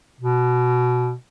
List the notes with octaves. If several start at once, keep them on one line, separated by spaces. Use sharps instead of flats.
B2